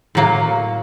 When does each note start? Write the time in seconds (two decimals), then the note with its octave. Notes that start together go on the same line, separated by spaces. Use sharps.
0.15 A2 F#3 A#3